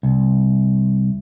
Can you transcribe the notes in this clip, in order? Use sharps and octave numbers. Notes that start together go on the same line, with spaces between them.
C2